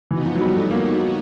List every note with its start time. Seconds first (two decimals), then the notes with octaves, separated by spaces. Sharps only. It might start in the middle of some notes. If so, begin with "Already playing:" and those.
0.11 E3 B3 D#4 F#4
0.26 F3
0.35 F#3
0.41 G3
0.56 A3
0.71 A#3